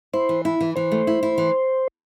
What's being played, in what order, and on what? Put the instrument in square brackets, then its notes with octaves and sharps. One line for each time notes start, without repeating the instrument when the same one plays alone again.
[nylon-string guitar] E4 [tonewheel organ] C5
[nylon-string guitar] E3
E4
E3
[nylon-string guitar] E3 [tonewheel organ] C5
[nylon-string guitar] A3
E4
E4
E3